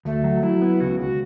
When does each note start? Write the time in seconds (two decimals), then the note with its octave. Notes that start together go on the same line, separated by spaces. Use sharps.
0.05 D2 A3
0.24 F#3
0.43 F#3 E4
0.62 B3
0.81 C#2 F#4
0.99 C#2 F#4